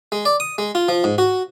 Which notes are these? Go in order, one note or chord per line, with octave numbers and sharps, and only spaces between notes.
G#3
D5
D#6
G#3
F4
F3
G#2
F#4